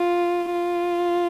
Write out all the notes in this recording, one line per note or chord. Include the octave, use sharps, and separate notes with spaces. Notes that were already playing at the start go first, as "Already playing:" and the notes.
Already playing: F4
F4